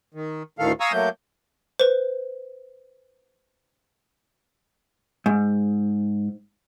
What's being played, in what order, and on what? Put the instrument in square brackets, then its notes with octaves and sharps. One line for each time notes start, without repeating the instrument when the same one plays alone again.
[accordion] D#3
D2 A2 D#3 A4 F5
F5 G#5 A#5 C#6 D#6 E6
F#3 A3 A#3 G6
[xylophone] B4 C5
[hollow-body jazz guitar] G#2